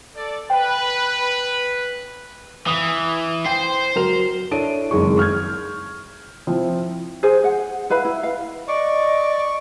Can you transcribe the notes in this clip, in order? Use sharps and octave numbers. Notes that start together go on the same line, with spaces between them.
A4 D5
B4 G5
E3 D#6 F7
C5 G5
F#3 A#4 F7
D4 E4 A4 C#5 D7 D#7
F#1 F2 D#3 G#3 G#4 C#6
C#6 F6 G6 G#6
F3 C4 E4
G#4 C5 G#5
F#5
E4 B4 F5 B5
E4
F5
D5 D#5 C#6